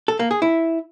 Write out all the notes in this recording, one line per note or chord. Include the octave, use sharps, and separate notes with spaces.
A4
A#3
G#4
E4